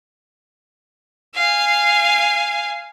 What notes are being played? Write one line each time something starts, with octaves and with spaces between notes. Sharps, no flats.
F5 G#5